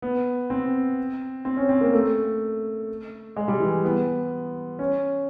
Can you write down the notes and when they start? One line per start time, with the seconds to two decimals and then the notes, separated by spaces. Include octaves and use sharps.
0.02 B3
0.50 C4
1.45 C4
1.57 C#4
1.69 C4
1.81 A#3
1.93 A3
3.37 G#3
3.48 G3
3.60 E3
3.85 B3
4.79 C#4